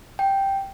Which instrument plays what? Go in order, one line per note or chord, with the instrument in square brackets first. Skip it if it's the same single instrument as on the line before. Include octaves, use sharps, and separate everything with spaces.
[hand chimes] G5